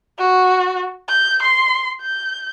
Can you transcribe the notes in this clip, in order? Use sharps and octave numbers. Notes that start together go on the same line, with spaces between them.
F#4
G6
C6
G6